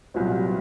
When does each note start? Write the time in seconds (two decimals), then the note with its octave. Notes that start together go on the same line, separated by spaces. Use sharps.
0.14 C2 A#2 F#3 B3